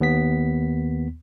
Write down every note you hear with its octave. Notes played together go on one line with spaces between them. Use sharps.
D#2 B3 B6